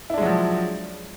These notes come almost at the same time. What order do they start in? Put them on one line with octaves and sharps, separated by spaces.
E4 D4 G#3 F#3 F3